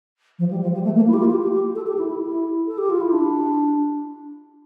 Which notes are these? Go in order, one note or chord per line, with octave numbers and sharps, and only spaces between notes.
F3
G3
F3
G3
A3
A#3
E4
G4
F4
G4
G4
G4
A4
G4
E4
E4
E4
A4
G4
F4
E4
D4